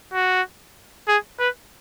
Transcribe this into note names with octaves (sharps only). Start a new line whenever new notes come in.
F#4
G#4
B4